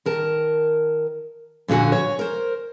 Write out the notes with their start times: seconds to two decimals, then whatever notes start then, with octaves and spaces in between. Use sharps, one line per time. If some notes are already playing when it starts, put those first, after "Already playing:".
0.06 D#3 A#4 A5
1.68 F2 A#2 D3 F#4 G#5
1.92 C#5
2.19 A#4 C5